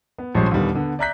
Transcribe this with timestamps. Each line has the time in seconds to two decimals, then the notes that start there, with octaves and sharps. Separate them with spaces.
0.18 B3
0.35 A#1 F3 G3 G#3 C#4 C5
0.51 D#2 A#2 D3 D#3 G3 B3
0.75 D3 B3
0.99 D5 E5 A#5 F#6 G6 B6